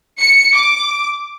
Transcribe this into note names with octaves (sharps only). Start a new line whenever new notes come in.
C#7
D6